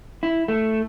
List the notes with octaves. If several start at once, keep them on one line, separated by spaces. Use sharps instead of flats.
E4
A3